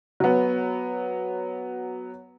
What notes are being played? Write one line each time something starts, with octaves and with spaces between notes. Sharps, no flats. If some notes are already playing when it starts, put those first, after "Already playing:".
F#3 B3